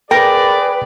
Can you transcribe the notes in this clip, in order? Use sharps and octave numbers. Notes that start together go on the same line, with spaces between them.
G#4 A#4 B4 D5 G5